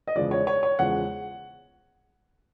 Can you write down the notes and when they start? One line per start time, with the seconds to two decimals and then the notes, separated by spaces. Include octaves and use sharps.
0.07 D#5
0.16 E2 C#3 F3 G#3 D5
0.31 C#5
0.47 C#5
0.63 C#5
0.79 E2 C#3 F3 G#3 F#5